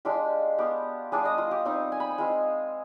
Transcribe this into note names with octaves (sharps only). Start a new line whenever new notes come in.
G#3 D4 F4 G4
B3 F4 G4
G3 D4 F4 G#4
D#5
F4
G4
G3 C4 D#4
G#5
B5
G#5
G#3 C4 F4